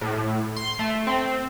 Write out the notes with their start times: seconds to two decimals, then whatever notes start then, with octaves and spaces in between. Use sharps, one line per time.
0.01 A2
0.56 C6
0.79 A3
1.07 C4